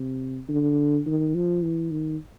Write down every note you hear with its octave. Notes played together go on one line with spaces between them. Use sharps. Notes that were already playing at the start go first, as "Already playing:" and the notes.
Already playing: C3
D3
D#3
F3
E3
D#3